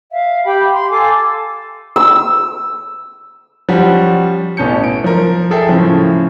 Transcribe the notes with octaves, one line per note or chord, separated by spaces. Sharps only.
E5 F5
G4 G5 B5
C6
A4 F5 G#5 D6
E6
F3 G3 C#4 F#4
A1 B2 C#4 A5 G6 C#7
D7
F3 A#4
G#4 A4 E5 G5
A2 C#3 F3